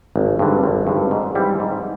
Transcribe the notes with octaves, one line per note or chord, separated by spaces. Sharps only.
G#1
G2 D3
G#1
G2 D3
G#2
E3 G3 C4 E4
G#2